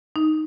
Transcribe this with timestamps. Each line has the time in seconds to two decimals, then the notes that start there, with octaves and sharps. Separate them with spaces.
0.16 D#4